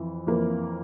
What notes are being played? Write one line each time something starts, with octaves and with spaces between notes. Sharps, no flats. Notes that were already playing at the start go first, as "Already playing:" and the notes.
Already playing: F2 E3
F2 E3 A#3